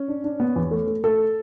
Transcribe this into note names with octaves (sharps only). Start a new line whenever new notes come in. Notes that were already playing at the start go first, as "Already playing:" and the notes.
Already playing: C#4
D4
D4
B3
E2
A3
A3
A3 A4